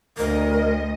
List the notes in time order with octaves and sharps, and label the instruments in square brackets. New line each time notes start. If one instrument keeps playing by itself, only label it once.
[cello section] D2 D#5 [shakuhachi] A#4